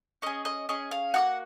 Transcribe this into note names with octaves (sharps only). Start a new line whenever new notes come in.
C#4 G#4 D#5
D#5
C#4 G#4 D#5
F5
A#3 D#4 F#4 F#5